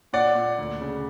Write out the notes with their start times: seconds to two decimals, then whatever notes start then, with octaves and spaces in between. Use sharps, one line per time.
0.13 A#2 D5 F#5
0.35 A#2
0.58 D2
0.81 C#3